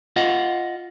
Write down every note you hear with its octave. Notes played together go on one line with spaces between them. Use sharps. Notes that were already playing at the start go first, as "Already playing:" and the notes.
F4 D#5 F5 F#5